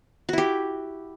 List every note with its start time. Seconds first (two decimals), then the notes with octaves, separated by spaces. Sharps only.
0.29 F#4
0.33 E4
0.38 G4